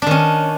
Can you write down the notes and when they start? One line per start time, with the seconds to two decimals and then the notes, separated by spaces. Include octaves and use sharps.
0.02 D4
0.06 D#3
0.11 C#4